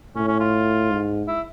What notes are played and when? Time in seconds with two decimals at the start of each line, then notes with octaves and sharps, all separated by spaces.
0.15 A2 C#4
0.28 C#4
0.40 F4
0.90 G#2
1.28 E4